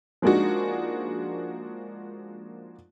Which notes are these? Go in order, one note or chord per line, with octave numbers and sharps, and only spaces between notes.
F3 G#3 A#3 D4 D#4 F#4